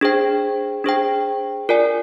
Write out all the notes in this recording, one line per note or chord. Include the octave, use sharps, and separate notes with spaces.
D4 G#4 C5 G5
D4 G#4 C5 G5
F4 A#4 D5 G#5